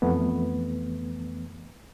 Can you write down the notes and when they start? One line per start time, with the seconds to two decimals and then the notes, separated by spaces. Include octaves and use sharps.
0.02 F2 E3 A3 B3